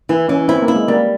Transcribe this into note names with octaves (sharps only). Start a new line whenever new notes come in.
E3 E4
E3 C#4
C4 E4
A#3
E4
G#3
G3 A#3